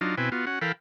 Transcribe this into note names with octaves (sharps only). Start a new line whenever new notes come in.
F#3 D4 D#4 F4
B2 C4 E4 B4 G5 G#5
B3 F4 F#4
C#4 F#4 F#5
E3 A4 A#4 F5 G5 B5